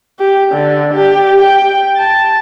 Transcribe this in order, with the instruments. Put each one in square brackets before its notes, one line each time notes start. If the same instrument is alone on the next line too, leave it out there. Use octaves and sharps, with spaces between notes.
[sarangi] G4
D3
G4
G5
A5